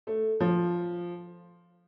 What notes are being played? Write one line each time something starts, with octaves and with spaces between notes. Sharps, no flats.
A3
F3